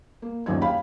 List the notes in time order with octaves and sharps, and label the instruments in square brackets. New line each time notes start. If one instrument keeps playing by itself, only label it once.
[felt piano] A#3
D#1 A#1 F#2 D#4 G#6
F5 G5 B5